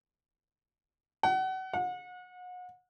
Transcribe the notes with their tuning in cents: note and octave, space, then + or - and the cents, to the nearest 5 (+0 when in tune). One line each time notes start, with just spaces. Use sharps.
F#5 +30
F#5 -35